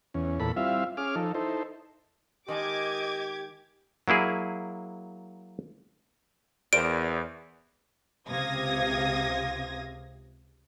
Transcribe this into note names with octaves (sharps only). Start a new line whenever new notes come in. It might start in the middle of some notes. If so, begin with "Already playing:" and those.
E2 C#4
E2 A#2 A4 B5
G3 C4 E4 F4 E5 F5
C#4 G#4 D6 F6
F3 D#4 A4
D#4 E4 A4 C5
D#3 G#3 G4 D#5 A5 D6 G#6
F#3 A#3 E4 G#4
E2 A#4 C5 D5 D7
C#2 C3 F5 D#6 G#6 A#6